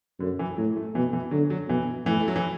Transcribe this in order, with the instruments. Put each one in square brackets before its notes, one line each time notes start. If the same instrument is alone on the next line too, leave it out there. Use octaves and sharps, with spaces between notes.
[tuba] F#2 [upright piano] D3
[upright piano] E3
[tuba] A2 [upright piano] F#3
[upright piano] A3
[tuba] B2 [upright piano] E3
[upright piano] E3
[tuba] D3 [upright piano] F#3
[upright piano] F#3
[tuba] B2 [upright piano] E3
[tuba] A2 [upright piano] E3
[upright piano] A3
F#3
E3